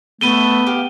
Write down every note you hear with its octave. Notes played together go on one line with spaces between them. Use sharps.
A3 B3 A4 B4 D#7 G7
G4 F5